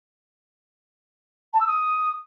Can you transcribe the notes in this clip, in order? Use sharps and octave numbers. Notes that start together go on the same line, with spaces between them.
A5
E6
D#6